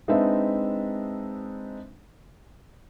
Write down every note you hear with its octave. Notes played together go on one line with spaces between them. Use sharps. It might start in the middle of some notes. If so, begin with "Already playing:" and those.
G#3 C4 D4 D#4 B4 E5